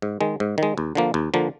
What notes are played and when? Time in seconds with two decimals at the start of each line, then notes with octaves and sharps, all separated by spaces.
0.02 G#2
0.21 D#3 G#3
0.40 G#2
0.58 D#3 G#3
0.78 D#2
0.95 D3 F3 A#3
1.14 D#2
1.34 D3 F3 A#3